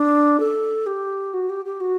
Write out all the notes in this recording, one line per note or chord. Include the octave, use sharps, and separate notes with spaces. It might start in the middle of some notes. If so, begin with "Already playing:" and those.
Already playing: D4
A4
G4
F#4
G4
G4
F#4